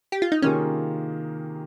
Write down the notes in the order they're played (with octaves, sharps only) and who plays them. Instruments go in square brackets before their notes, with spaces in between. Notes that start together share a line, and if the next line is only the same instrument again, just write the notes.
[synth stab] G4
F4
D#4
[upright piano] C3 D#3 A#3 F4 G#4 [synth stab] C#4